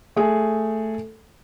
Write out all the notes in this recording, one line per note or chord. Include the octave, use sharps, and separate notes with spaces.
A3 G#4